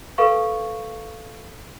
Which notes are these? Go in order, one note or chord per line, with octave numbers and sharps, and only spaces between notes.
A4 B4 F5 C#6